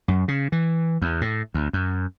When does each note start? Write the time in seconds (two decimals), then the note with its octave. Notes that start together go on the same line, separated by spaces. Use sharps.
0.08 F#2
0.28 C#3
0.52 E3
1.02 E2
1.21 A2
1.54 D2
1.73 F#2